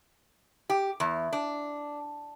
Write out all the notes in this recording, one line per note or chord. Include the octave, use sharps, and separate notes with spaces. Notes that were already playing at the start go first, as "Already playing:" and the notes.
G4
E2
D4